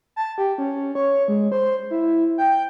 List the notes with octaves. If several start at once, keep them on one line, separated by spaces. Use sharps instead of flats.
A5
G4
C#4
C#5
G#3
C5
E4
G5